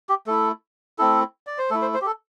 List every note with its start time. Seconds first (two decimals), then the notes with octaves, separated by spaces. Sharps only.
0.09 G4
0.27 A3 E4 A4
0.98 A3 C4 E4 A4
1.47 D5
1.58 C5
1.70 A3 A4
1.75 E4
1.82 C5
1.94 C5
2.01 G4
2.06 A4